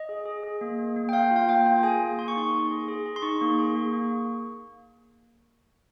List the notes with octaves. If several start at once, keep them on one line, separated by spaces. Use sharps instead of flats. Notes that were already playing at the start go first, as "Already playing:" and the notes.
Already playing: D#5
G#4
G#4
G#4
A#3
A#3
A#3
G5
A#3 F5
F4
F5
A#3 G5
F4
G#4 G#5
A#3
A#3 C6
C#6
D#4 C6
A#3
G#4
G#4
G#4
C6
D#4 C#6
A#3
G#4
A#3
A#3